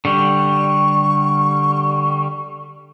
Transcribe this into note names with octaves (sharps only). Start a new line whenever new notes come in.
D3 G3 C#6